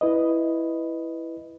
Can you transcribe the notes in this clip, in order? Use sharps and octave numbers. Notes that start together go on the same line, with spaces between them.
E4 B4 D#5